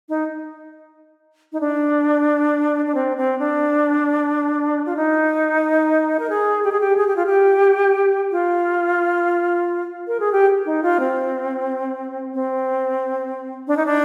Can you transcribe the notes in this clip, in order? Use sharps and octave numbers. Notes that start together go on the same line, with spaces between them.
D#4
D#4
D4
D4
C4
C4
D4
F4
D#4
A#4
G#4
G4
G#4
G4
G#4
G4
F4
G4
F4
A#4
G#4
G4
D#4
F4
C4
C4
D4
D#4
D4